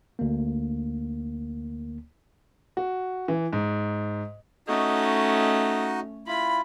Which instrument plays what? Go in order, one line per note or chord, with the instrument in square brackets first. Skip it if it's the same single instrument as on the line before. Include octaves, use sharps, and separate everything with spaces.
[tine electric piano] D2 A#3
[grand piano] F#4
E3
G#2
[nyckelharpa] A3 C#4 [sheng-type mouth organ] D#4 F#4 D#5
[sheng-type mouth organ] E4 F4 [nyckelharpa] B5